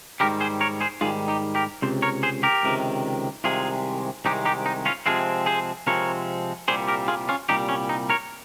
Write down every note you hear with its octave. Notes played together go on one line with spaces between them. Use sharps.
G#2 D#3 G3 G4 A#4
G#4 C5
A#4 C#5
G#4 C5
G#2 D#3 G3 F4 G#4
D#4 G4
G4 A#4
C#2 C3 C5
A#4 C#5
G#4 C5
G4 A#4
C#2 C3 D#3
C2 C3 D#3 G#3 F4 G#4
C2 C3 D#3 G#3 D#4 G4
D#4 G4
D#4
C#4 F4
C3 F3 G#3 C4 F4 G#4
G#4 C5
C3 F3 G#3 C4 A#4 C#5
C2 A#2 G3 G#4 C5
G4 A#4
F4 G#4
C#4 F4
C2 A#2 G3 D#4 G4
C#4
D#4
A#4 C#5